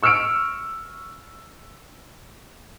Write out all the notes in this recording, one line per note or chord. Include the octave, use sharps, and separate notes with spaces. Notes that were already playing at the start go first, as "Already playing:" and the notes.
C#6 E6 F6 C#7 D7